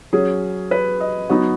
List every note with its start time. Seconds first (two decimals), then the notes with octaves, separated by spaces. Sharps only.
0.13 F#3 C#4 G#4
0.71 B4
1.00 D#5
1.30 F#3 B3 D#4 F#4